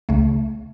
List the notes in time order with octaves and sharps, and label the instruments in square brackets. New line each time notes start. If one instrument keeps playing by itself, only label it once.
[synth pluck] C#2 C#3 A3